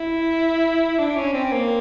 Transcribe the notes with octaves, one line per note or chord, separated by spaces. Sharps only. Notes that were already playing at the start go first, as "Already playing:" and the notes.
Already playing: E4
D4
C#4
C4
A#3